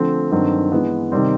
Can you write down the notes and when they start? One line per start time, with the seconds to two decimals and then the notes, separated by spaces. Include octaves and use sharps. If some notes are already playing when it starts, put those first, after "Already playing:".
Already playing: D3 F3 A3 C4
0.32 G2 D#3 F#3 A3 C4
0.72 E3 G#3 B3
1.12 C3 D#3 G3 C4